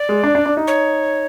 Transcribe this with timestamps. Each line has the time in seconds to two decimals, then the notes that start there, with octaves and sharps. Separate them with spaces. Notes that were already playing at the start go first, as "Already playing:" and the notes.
Already playing: D5
0.09 G#3
0.24 D4
0.35 D4
0.46 D4
0.57 D#4
0.67 C#5